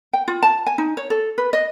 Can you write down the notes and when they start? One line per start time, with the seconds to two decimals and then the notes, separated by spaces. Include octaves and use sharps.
0.13 G5
0.28 F4
0.43 A5
0.66 G#5
0.78 D#4
0.97 C#5
1.10 A4
1.38 B4
1.53 D#5